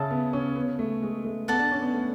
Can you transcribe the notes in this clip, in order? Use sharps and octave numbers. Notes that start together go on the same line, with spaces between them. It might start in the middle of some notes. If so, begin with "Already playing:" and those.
Already playing: C#3 A4 E5 A5
B3
C#4
B3
A3
G#3
A3
B3 A4 D5 F#5 A5
D4
C#4
B3
A3